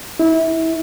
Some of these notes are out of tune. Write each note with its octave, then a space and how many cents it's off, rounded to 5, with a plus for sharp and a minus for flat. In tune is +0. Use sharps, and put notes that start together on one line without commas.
E4 -25